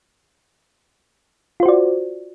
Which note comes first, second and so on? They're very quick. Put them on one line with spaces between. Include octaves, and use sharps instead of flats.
F4 C5 F#4 D5